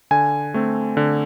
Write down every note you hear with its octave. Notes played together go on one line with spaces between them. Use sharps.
D3 G#5
A3 C4
D3